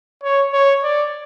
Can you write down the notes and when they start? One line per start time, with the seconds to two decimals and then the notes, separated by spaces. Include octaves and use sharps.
0.23 C#5
0.53 C#5
0.84 D5